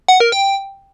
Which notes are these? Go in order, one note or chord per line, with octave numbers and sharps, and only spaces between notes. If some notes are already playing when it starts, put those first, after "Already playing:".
F#5
A#4
G5